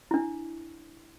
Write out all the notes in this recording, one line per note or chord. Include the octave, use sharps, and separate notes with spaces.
D4 E4